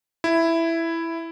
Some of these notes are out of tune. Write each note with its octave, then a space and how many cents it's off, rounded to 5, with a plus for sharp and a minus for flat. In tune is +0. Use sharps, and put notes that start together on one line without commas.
E4 +5